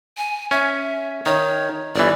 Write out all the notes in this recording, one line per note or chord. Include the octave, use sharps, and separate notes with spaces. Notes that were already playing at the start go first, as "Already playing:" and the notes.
G#5
C#4 E5
D#3 C#5
G1 E3 D5